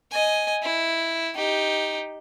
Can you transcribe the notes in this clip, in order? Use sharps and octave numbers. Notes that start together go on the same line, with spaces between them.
D#5 G#5
E4
D#4 G4